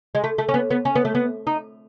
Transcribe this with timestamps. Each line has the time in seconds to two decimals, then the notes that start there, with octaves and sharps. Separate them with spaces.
0.15 G#3
0.24 A3
0.38 A3
0.49 C#4
0.54 B3
0.70 B3
0.85 C#4
0.95 B3
1.05 A3
1.15 B3
1.47 D#4